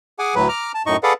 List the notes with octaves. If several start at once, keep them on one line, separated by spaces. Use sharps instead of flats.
G#4 F#5 G#5 D6
D2 A2 F#3 B4
A#5 D6 F6
A5
F#2 A2 D#4 D#5 C#6
G#4 A4 B4 D5 F5 F#5